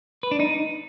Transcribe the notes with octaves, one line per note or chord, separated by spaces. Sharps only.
B4
D4
D#4